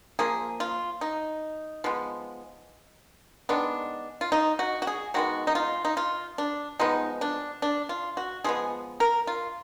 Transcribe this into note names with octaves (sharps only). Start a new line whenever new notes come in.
F3 A#3 G#4
F4
D#4
F3 G#3 B3
D#3 G#3 B3 D4
F4
D#4
F#4
F#4
G#4
D#3 G#3 B3 F#4
D#4
F4
D#4
F4
D4
F3 G#3 B3 D#4
D4
D4
F4
F#4
F3 G#3 B3 G#4
A#4
F4